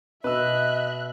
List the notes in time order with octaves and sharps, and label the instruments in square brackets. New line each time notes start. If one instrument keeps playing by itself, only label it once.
[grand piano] B2 [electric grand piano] B4 E6 [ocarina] D#5 [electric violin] E5 F#6